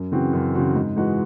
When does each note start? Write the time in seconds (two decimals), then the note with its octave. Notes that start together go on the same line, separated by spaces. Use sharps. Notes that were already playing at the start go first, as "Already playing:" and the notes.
Already playing: F#2
0.12 C#3 E3 C4 F#4
0.33 F#2
0.54 C#3 E3 C4 F#4
0.75 G#2
0.96 E3 G#3 D#4 F#4